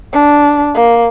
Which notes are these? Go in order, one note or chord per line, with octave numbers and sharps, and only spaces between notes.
D4
A#3